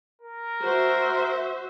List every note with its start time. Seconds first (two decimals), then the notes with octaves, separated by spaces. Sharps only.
0.22 A#4
0.64 F#4 C5 E5